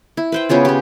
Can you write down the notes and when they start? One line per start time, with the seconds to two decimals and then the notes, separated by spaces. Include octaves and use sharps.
0.17 E4
0.32 B4 C5 G5
0.49 C#3 B3 C#4 F4
0.65 C#4 G4